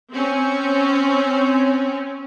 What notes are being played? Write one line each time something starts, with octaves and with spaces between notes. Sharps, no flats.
C4 C#4